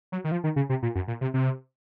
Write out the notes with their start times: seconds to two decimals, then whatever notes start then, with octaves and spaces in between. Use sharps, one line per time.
0.12 F#3
0.24 D#3
0.32 F3
0.44 D#3
0.56 C#3
0.69 C3
0.83 A#2
0.95 F#2
1.08 A#2
1.21 C3
1.34 C3